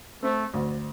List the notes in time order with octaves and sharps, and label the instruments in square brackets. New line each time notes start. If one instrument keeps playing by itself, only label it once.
[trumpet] A3 [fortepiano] C4
[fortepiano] D2